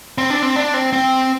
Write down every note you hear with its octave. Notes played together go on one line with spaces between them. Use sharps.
C4
D4
C4
D4
C4
C4